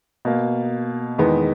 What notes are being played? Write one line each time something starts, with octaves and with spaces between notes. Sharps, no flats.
B2 A#3
E2 D#3 G#3 B3